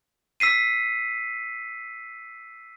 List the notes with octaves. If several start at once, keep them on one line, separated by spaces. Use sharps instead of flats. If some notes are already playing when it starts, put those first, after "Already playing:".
E6 B6 C7 D#7